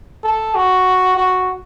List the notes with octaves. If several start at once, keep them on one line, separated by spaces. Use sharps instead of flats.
A4
F#4
F#4